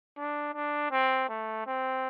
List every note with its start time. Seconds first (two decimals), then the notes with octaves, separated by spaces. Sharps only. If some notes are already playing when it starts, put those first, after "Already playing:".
0.17 D4
0.54 D4
0.91 C4
1.29 A3
1.67 C4